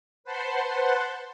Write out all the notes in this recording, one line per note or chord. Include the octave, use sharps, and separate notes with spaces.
B4 C5 F#5 A5 C6